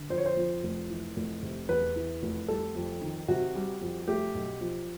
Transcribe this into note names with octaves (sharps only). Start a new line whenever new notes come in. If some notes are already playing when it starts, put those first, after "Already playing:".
Already playing: D3
F2 C5
C#5
C5
F3
F1
E3
F1
C3
E2 B4
E3
F1
G3 A4
F2
D#3
C3 F#4
G3
F2
A3 G4
B1
F3